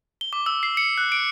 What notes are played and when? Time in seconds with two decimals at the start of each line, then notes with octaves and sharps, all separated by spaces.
0.21 G7
0.33 D6
0.46 E6
0.63 C7
0.77 C#7
0.98 F#6
1.12 D7